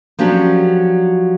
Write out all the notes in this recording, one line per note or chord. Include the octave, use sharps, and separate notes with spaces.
F3 F#3 C#4 D4 G4 A4